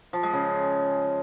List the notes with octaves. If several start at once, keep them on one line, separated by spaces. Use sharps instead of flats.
F3
G#3
C#3